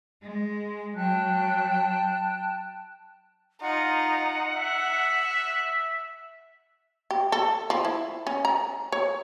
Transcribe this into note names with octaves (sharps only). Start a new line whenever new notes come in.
G#3
F#3 G5 A5 F#6
D#4 F4 F#5
E5 F#6
G4
A4
F3
E4
C#4
A#5
C#5